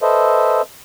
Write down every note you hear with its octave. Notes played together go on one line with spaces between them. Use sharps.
A4 B4 C5 D#5 E5